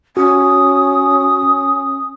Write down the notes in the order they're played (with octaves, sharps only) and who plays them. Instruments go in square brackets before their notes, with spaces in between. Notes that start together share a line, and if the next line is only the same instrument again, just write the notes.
[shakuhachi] C#4 [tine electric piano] F#4 [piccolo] D#6